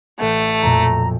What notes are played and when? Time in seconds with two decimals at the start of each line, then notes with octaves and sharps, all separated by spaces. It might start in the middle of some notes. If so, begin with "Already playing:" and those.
0.19 A1 A3 A4 F#5
0.62 B1 F2 A#2 A#5